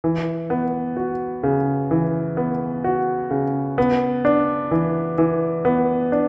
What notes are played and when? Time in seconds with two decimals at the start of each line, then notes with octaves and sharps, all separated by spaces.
0.04 E3
0.50 B3
0.97 F#4
1.43 C#3
1.91 E3
2.37 B3
2.84 F#4
3.31 C#3
3.78 B3
4.25 D4
4.71 E3
5.18 E3
5.65 B3
6.12 D4